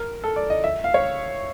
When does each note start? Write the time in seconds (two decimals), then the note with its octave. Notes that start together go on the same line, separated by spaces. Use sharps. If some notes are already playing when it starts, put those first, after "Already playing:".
Already playing: A#4
0.24 A4
0.36 D5
0.50 D#5
0.64 E5
0.84 F5
0.94 C#5